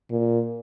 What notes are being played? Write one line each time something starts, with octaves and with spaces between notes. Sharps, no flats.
A#2